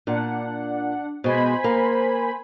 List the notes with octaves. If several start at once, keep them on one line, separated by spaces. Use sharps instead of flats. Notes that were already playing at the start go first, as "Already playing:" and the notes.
A#2 D4 F#5
B2 G#3 C5 G#5 B5
A#3